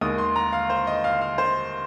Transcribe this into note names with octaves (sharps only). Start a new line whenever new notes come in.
D#2 D#3 G#3 D#6
C6
A#5
F5
C5
D#5
F5
F5
C5